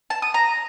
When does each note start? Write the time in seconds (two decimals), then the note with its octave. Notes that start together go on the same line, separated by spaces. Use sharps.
0.10 A5
0.22 D#6
0.34 A#5